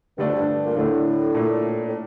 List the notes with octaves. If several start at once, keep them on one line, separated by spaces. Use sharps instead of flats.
G2 D3 A3 D4
F2
G2
G2
A#2
A2 D3 A3 D4
A#2 A3 D4
A2